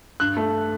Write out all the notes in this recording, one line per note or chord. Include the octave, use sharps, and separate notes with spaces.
G2 F#6
A3